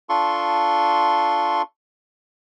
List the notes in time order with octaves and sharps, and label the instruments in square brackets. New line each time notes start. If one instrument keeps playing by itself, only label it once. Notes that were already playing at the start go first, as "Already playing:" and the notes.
[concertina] D4 F4 A4 C6 C#6